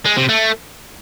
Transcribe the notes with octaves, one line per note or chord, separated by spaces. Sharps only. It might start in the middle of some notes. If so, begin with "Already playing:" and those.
G#3
C3
A3